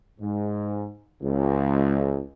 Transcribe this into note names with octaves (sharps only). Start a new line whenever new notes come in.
G#2
C#2